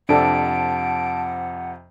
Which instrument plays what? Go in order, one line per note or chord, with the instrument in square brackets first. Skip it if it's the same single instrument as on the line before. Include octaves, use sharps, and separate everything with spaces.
[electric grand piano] F2 C3 [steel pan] D4 A4 [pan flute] F#5 [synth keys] A5 D7